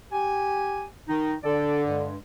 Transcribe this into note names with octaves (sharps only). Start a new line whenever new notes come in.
G4 G#5
D#3 D#4
D3 A4 D5
G2 G#3